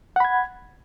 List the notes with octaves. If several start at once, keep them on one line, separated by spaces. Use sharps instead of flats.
F#5 B5 G#6